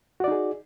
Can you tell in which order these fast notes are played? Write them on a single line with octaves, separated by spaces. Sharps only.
F#4 D5 D#4 G#4